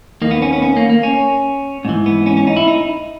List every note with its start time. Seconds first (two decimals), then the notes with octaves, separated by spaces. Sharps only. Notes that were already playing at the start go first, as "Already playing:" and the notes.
0.22 D#2 D#3 A#3
0.31 B3
0.42 C#4
0.53 B3
0.62 C#4
0.77 A#3
0.90 A#3
1.03 C#4
1.85 G#2 E3
2.06 B3
2.26 C#4
2.37 C#4
2.47 D#4
2.56 E4
2.68 D#4